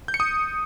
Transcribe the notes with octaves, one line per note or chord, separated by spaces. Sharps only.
G6
C#7
D#6